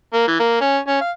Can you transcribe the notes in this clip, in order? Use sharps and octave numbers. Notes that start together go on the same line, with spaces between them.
A#3
E3
A#3
C#4
C#4
F5